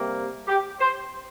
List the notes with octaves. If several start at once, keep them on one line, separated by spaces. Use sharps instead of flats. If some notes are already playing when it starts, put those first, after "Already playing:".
Already playing: C3 G3 A#3
G4
C5